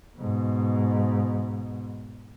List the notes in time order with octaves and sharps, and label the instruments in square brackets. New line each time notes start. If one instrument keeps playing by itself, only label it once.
[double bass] G#2 B2